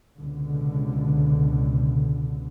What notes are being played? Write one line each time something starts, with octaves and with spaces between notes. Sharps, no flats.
C#2 B2 D3